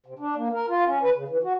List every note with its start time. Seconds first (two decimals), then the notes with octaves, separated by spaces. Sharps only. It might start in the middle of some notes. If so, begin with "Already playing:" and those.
0.06 C3
0.19 D4
0.36 A#3
0.53 A#4
0.69 F4
0.87 C#4
1.02 B4
1.15 C#3
1.28 E3
1.44 F#4